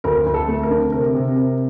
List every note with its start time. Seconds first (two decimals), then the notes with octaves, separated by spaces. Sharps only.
0.04 D2 A#4
0.26 D2
0.34 A4
0.48 A3
0.63 A#4
0.71 D3
0.92 C3 A#4
1.15 C3
1.36 C3